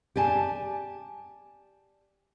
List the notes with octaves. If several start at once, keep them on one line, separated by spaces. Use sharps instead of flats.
G4 D5 G#5 A5